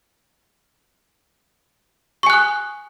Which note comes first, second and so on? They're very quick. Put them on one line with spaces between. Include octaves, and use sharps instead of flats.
C#6 G#5 F#6 D#6